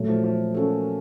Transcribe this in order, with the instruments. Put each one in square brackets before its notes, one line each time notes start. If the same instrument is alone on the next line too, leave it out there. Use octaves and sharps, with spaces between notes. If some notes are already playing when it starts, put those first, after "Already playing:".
Already playing: [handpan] A#2 F#3 A3
[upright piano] F3
F3
[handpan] A#3 C#4 F#4 A4